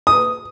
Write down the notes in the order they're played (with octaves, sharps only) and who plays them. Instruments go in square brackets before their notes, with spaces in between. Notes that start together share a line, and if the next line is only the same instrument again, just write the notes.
[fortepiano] D#6